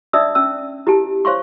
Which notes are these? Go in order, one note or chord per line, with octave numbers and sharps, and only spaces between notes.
D4 D#4 D5 E5 D#6 E6
C#4 E6
E4 G4 A5
C5 C#5 F5 C6 C#6